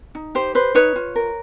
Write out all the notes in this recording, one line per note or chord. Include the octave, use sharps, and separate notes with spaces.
D#4
G4 C5
B4 C5
D#4 B4 C#5
F4
A#4